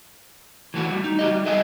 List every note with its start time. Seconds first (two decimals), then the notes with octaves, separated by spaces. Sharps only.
0.74 E3 A3 F#4
0.91 G3
1.04 D#4
1.19 F#4 G4 D#5
1.31 G3
1.45 G#4 D#5 E5 F#5 G#5